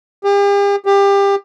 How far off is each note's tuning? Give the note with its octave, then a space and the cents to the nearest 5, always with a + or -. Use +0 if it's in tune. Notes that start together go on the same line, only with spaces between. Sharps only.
G4 +45
G4 +25